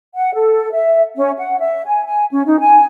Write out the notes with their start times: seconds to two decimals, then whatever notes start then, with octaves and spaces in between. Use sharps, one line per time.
0.15 F#5
0.34 A4
0.73 E5
1.16 C#4
1.38 F#5
1.59 E5
1.85 G#5
2.06 G#5
2.31 C#4
2.46 D#4
2.59 G#5